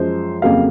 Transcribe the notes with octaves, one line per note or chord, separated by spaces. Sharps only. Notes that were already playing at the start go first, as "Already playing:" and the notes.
Already playing: F#2 F3 G#3 C5
F2 C#3 F#3 A#3 F5